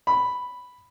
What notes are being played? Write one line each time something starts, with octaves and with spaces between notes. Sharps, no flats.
B5